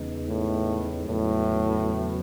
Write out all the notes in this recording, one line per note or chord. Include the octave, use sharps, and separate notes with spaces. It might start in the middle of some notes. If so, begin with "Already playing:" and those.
Already playing: E2 C#3 G#3 B3 D#4
A2
E2 A2 C#3 F#3 B3